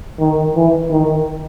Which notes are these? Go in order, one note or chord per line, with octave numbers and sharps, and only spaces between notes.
D#3
E3
D#3